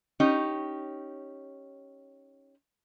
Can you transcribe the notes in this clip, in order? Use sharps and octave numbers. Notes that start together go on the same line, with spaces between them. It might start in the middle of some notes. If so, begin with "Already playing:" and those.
C#4 D#4 G4